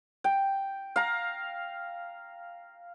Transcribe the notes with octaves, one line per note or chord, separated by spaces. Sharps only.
G5
F5 A#5